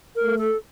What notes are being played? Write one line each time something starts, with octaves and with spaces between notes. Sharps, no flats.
A#4
A3
A4